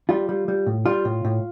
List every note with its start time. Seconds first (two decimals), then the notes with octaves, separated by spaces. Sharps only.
0.09 G3 F4
0.29 G3
0.48 G3
0.67 A2
0.86 G3 F4
1.05 A2
1.25 A2